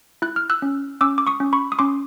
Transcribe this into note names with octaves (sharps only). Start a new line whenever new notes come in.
E4 F#6
F6
E6 F#6
C#4
C#4 D6 E6
D6
C#6 D#6
C#4
B5 C#6
D#6
C#4 C6 D6